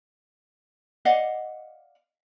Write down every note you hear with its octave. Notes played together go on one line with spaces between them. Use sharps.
D5 D#5 F5 F#5